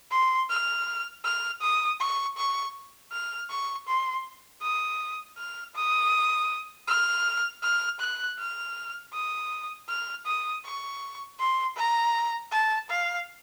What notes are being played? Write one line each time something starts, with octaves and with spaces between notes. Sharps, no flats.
C6
F6
F6
D#6
C#6
C#6
F6
C#6
C6
D#6
F6
D#6
F6
F6
F#6
F6
D#6
F6
D#6
C#6
C6
A#5
A5
F5